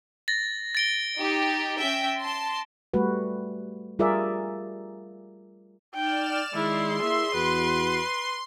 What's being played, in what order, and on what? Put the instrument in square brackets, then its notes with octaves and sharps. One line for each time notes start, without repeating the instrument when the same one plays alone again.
[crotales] A6 A#6
A6 D7 G7
[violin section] D#4 G4
C#4 E5 G5
A5 C6
[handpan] G3 A3 F#4 B4
G3 F4 G#4 A#4 D5 E5
[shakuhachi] D#4 [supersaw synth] D5 F6 E7 [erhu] G5
[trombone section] D#3 G#3 [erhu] E4 [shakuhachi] G#4 [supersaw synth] C6
[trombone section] A#3 E4 [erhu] E5
[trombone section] E2 F#4 [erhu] B4